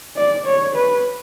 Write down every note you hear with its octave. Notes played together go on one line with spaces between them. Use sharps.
D5
C#5
B4